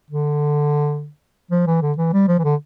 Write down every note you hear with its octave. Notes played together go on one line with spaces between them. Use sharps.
D3
F3
E3
D3
E3
G3
F3
E3
D3